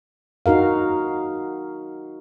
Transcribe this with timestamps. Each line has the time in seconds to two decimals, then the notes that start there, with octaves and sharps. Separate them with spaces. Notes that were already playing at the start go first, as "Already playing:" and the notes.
0.46 D#4 F#4 A#4 F5